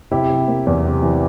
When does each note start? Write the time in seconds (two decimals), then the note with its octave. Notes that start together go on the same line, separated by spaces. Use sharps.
0.11 C3 E4 G4
0.30 C3
0.48 A#3
0.67 E2
0.85 C3
1.03 E3